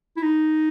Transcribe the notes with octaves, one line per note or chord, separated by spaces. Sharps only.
E4
D#4